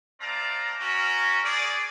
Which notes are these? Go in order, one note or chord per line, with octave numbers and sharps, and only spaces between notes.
A3 C4 D5 F5 A5 A#5
C#4 F#4 A#4
G#4 D5